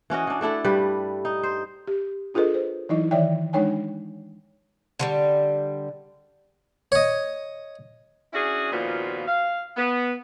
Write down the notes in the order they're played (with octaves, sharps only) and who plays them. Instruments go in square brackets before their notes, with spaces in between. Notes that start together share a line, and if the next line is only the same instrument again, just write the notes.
[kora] E3 C#4 F#4 D#5
E3 D4
A3 D4 E4 A4
G2 G3 B4
D#4
C5
[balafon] G4
D4 F4 G#4 A4 B4 D#5
C5
E3 F#3 D#4 E4 D#5
D#3 E3 C#5 D5 E5 G5
G#3 D4 D#4 C#5 G5 G#5
[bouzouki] D3 F#3 G3
[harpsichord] C#5 D#5
[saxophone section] C#4 D4 E4 F#4 G#4
D#2 A#2 F3 B3 F4 F#4
F5
B3